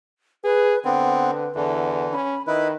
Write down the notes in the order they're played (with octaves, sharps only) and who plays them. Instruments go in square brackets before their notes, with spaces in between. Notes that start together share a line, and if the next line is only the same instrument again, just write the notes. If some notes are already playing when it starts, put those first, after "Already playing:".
[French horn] G#4 [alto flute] B4
[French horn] D3 [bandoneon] B3 C4 [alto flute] B4
[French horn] E2 [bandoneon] D3 E3
[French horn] C#4 [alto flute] B5
[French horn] D#3 [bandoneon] E4 B4 [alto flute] D#5